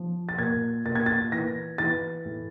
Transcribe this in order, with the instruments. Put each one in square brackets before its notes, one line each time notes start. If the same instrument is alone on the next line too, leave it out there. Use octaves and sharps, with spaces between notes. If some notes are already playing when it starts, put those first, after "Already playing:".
Already playing: [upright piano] F3
A6
A#2 G#6
A#2 A6
G#6
A6
E3 A#6
E3 A6
A2